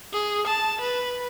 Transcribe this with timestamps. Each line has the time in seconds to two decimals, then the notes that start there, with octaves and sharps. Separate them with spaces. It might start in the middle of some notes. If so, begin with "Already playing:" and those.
0.13 G#4
0.47 A5
0.80 B4